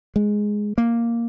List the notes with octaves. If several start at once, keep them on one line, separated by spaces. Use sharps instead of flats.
G#3
A#3